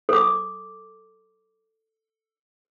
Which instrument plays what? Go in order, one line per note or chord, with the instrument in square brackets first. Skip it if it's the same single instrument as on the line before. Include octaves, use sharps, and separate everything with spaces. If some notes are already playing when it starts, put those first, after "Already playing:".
[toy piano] A4 D6